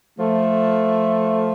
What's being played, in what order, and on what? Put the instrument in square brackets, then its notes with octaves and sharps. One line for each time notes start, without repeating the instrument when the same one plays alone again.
[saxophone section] F3 A3